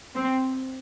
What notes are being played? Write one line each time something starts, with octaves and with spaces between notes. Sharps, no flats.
C4